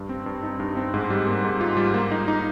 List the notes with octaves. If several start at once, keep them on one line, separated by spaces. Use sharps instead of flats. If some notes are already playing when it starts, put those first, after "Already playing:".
Already playing: G2
C4
G2
D#4
G2
C4
G#2
G3
A#3
G#2
F4
G3
A#3
D#4
D#4